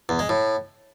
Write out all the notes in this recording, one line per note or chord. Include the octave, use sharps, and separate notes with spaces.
E2
G#3
A2